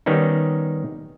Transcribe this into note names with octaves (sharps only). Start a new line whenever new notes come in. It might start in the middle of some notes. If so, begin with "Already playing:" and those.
D#3 G3 B3 C#4 D#4